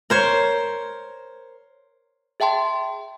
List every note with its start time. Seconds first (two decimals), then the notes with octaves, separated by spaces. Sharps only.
0.10 A#4 C5 C#5
2.40 G#4 E5 G5 A5 C6